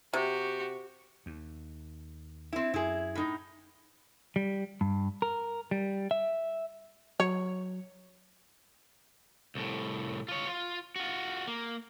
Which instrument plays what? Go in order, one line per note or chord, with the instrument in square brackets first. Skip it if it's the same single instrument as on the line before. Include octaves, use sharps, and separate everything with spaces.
[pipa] C3 [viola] F#4 G4
[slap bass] D#2
[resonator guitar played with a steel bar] C4 E4
[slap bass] F#2 [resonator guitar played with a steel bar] E4 G#4
[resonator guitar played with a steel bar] A2 D#4
[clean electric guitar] G3
G2
A#4
G3
E5
[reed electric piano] F#3 [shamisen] C#5
[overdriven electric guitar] C2 A2
F4 C#5
F4
F4 F#4
A#3